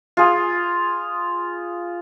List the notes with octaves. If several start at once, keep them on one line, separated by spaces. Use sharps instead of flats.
F4 G#4